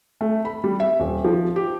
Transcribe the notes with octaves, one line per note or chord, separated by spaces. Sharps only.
A3
B5
G3
E5
D#1
F3
G4